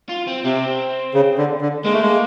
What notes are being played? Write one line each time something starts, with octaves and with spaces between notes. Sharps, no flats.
F4
C4
C3 C4
C#3
D3
D3
G#3 A#3
A3
G#3